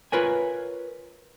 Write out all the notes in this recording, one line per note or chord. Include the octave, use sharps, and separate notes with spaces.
F4 A#4 B4 C#5 G#5